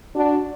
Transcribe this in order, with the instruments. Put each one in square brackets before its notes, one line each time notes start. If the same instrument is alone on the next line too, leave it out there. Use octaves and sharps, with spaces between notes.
[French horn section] D4 F#4